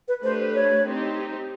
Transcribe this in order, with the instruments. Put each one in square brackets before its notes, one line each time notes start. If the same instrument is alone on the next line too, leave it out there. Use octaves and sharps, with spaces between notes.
[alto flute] B4
[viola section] A3 D4 G4 B4 [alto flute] C5
[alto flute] C#5
[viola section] C4 D#4 G4